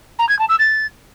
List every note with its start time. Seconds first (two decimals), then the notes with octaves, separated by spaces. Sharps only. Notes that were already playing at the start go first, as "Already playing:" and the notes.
0.19 A#5
0.29 G#6
0.39 A5
0.49 E6
0.59 A6